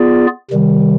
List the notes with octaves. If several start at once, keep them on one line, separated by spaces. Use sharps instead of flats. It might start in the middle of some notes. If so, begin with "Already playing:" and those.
Already playing: B3 F4 G#4 D5
C3 D#3 G3